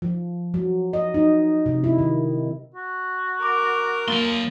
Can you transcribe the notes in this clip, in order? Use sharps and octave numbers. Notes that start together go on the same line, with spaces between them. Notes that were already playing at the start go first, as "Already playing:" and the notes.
F3
F#3
D#5
D#4
C3
E4
D#3
F#4
A#4 D6
F#3 A#3 C6 A6